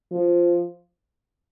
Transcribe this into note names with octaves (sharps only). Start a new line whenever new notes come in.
F3